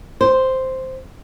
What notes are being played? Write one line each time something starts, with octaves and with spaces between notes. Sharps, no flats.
C5